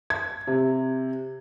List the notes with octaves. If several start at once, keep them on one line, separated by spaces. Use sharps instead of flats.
G#6
C3